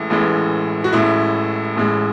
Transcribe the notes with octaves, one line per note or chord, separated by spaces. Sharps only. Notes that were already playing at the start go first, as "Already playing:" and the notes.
Already playing: A1 A2 E3 G#3 E4
A1 A2 E3 G#3
F#4
A1 A2 G#3 E4
A1 A2 G#3